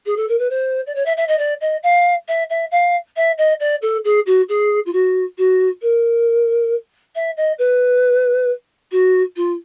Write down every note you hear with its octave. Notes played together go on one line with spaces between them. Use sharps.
G#4
A4
A#4
B4
C5
D5
C#5
E5
E5
D#5
D5
D#5
F5
E5
E5
F5
E5
D#5
D5
A4
G#4
F#4
G#4
F4
F#4
F#4
A#4
E5
D#5
B4
F#4
F4